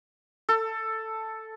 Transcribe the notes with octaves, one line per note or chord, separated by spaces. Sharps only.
A4